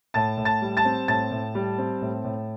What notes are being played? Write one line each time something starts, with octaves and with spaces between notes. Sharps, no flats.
A2 A5 A6
A2
A5 A6
G3
A5 A6
C4
A2 A5 A6
A2
G3
C4
A2
A2